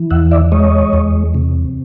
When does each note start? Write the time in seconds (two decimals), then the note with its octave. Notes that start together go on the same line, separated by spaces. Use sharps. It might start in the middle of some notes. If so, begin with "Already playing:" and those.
Already playing: E3
0.11 E2 E5 F#5
0.31 D5 E5
0.52 G#3 C#5 D#5
0.93 E2
1.34 C3